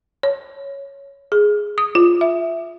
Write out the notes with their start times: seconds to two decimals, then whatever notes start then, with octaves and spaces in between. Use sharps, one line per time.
0.23 C#5
1.32 G#4
1.78 D#6
1.95 F4
2.21 E5